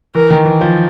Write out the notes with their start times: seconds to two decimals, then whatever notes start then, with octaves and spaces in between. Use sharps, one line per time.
0.15 E3 A#4
0.30 D#3
0.45 E3
0.61 F3